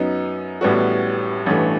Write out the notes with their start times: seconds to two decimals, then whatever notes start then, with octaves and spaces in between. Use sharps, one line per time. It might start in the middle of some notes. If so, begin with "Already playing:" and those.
Already playing: F#2 F#3 B3 D#4
0.61 A1 A2 G3 B3 F#4
1.46 A1 G2 E3 A3